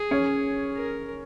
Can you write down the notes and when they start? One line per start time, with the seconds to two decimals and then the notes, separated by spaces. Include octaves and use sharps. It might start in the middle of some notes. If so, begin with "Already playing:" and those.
Already playing: G#4
0.11 C#4 C#5
0.76 A#4